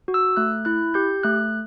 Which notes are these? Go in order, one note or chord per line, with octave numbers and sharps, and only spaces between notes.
F#4
E6
A3 F#6
E4 F#6
G4 G6
A3 F#6